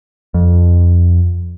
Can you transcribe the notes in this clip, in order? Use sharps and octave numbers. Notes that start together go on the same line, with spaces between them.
F2